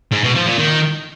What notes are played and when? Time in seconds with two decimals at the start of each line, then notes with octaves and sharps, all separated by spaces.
0.12 G#2
0.23 B2
0.35 F3
0.46 A#2
0.58 D#3